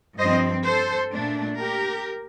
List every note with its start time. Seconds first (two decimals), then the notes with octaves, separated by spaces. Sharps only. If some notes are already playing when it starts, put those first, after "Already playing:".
0.19 G2 F3 C4 C5 D#5
0.66 A4 C5
1.13 A#2 A3 D4
1.60 G4 A#4